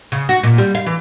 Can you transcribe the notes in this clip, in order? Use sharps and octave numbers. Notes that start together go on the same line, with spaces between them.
C#3
F#4
A#2
G3
F5
E3